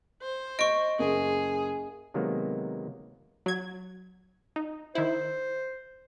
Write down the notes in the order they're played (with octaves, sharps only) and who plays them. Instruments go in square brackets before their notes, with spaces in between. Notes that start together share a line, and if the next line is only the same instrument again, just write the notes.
[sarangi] C5
[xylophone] D#5 C#6 [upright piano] D7
[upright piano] F#1 [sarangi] G#4
[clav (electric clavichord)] C3 D#3 F#3 G#3 A#3 B3
[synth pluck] F#3 G#6
D#4
[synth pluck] D#3 E4 [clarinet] C5